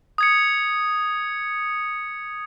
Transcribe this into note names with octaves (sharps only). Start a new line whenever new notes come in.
D#6 G#6 C#7